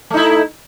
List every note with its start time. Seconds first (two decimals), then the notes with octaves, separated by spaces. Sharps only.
0.11 A3
0.14 D#4
0.17 E4